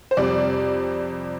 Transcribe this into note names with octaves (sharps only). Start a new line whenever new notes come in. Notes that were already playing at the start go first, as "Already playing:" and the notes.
C5
F2 C3 G3 D5